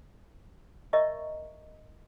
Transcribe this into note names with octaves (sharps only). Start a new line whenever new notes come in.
A#4 C#5 D#5 E5 A#5 C#6